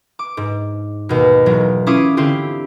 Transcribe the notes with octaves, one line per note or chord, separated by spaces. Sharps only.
D6
G#2
D#2 B2
E1 F#3
C#4 E4 F4 D6 D#6 D#7
D3 C4 E4 F4 G4